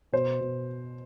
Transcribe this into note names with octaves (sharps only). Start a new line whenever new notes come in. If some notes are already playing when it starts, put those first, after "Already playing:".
B2 C5
B2